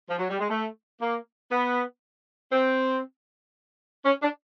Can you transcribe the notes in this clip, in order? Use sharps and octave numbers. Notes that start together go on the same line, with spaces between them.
F3
F#3
G3
G#3
A3
A#3
B3
C4
C#4
D4